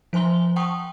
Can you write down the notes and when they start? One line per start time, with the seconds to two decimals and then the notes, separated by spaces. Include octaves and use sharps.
0.13 F3 C5 G#5 C6 G7
0.56 F#5 G5 A5 C#6 D#6